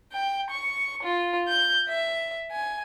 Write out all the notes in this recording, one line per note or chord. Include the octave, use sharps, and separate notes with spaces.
G5
C#6
F4
G6
E5
G#5